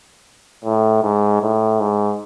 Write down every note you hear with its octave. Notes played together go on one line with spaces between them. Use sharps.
A2
G#2
A2
G#2